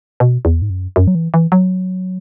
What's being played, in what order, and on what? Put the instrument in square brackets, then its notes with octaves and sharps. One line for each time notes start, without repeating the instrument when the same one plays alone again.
[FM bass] B2
E2
G#2
F#2
F#2
F#3
E3
E3
F#3